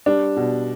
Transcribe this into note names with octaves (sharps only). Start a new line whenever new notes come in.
G3 D4
B2